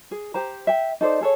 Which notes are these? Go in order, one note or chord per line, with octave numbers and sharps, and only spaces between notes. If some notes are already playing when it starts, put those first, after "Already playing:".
G#4
G4 C5 A#5
E5 G5
D#4 A4 C5 D5
G#4 A4 C#5